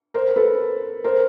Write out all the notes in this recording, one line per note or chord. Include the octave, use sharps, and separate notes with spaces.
A#4 C5
A4 B4
A#4 C5